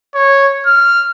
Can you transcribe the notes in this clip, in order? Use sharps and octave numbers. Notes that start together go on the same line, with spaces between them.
C#5
F6